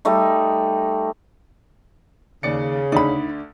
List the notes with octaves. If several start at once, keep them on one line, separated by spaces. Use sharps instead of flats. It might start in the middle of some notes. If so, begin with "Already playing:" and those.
G3 A3 D#4
D#2 C#3 D5 C#7
D2 D3 D#4 D5 B5